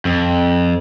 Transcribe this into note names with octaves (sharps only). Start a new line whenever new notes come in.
F2